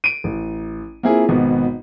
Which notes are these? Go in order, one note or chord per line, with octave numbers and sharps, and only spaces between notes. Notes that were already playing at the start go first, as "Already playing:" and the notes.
D7 D#7
A1
A#3 C4 E4 F4 G#4
G#1 B2 B3